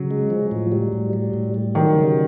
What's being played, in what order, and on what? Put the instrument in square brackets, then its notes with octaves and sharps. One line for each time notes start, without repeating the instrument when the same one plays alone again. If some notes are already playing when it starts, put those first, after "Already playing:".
Already playing: [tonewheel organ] C#3 [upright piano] F#3
[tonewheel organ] G#3
F3
A2
G3
A2
G3
A2
G3
[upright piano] D#3 [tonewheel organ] F#3
[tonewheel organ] C#3